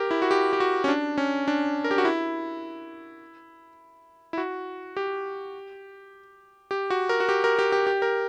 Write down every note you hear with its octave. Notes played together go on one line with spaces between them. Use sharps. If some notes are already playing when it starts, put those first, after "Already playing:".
Already playing: G4 A#4
E4
F#4
G4
G4
F#4
C#4
D4
C#4
D4
A#4
G4
F#4
E4
E4
F#4
G4
G4
F#4
A#4
F#4
G4
A#4
G4
G4
G4
A#4